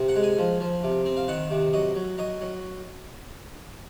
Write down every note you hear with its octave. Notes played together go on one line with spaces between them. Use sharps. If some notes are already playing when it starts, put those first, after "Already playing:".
Already playing: C3
F#5
G#3
G#5
F3
F3
C3
C4
F5
D#3 F#5
C3
F#3 D#5
F#3
F#3 D#5
F#3